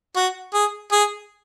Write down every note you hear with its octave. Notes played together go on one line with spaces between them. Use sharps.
F#4
G#4
G#4